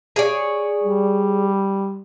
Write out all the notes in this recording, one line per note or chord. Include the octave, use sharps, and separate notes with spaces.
G#4 C#5 D5
G3